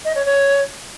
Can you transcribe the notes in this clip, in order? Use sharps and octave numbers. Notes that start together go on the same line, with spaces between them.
D#5
C#5
C#5